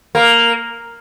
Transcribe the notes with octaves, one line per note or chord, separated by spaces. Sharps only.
A#3